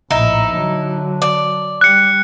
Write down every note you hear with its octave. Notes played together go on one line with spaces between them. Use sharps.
A#1 A2 D#4 E4
D3 F#3
D5
G3 F#6 C#7